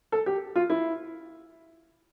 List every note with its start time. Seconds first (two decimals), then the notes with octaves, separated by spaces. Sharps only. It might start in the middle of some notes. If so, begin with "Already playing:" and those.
0.12 A4
0.26 G4
0.56 F4
0.70 E4